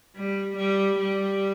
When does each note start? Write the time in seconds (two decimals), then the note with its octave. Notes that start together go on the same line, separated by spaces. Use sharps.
0.16 G3
0.57 G3
0.99 G3